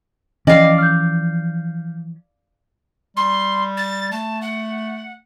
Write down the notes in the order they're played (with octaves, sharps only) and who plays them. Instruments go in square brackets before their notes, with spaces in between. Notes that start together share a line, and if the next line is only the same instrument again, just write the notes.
[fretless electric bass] E3 F3 [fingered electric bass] C#4 [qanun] D5 F5 [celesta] D#5 G5 A#6
[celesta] F6 G6
[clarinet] G3 [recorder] C6
[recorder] A6
[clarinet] A3 [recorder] A5
[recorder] F#5